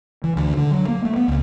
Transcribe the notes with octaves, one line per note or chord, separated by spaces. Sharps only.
E3
D2
D3
F#3
A#3
A3
B3
C#2